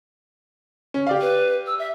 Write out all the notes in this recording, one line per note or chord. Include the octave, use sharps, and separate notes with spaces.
C#4
G4 D5 F5
B4
E6
E5